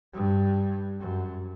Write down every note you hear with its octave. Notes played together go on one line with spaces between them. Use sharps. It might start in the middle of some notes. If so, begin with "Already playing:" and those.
G2
F#2